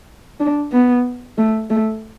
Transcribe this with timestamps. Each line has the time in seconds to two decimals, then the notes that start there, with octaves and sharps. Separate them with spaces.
0.40 D4
0.72 B3
1.38 A3
1.70 A3